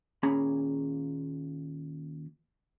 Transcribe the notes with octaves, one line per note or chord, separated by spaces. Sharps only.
D#2 A#2 C#4 G#4 A#5 B5